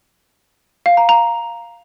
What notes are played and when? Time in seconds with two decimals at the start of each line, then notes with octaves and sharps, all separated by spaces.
0.86 F5
0.97 A#5
1.09 A#5